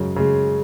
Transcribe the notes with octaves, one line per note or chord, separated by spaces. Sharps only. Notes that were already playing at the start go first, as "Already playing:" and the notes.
Already playing: F#2 C#3 G#3
C#3 G#3